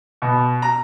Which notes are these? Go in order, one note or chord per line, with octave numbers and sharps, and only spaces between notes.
B2
A#5